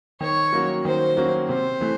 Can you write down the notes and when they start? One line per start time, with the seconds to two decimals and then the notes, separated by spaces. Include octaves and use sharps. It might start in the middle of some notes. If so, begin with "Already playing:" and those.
0.21 D#3 C#5
0.53 F#3 A#3 C#4 F#4
0.85 D#3 C5
1.17 F#3 A#3 C#4 F#4
1.49 C3 C5
1.81 E3 A3